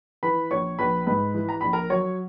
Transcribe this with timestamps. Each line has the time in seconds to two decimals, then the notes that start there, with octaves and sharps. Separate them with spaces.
0.23 E3 B4 B5
0.51 A#1 C#5 C#6
0.79 A#1 B4 B5
1.07 G#2 B4 B5
1.34 E3
1.49 A#5
1.61 A#1 B5
1.73 A#4 A#5
1.90 F#3 C#5 C#6